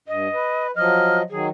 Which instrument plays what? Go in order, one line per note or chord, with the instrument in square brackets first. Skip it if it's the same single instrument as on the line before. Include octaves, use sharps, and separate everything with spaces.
[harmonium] G2 [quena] D#5
[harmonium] B4
[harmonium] F3 F#3 D#5 [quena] F6
[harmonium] D#3 F#3 [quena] G#4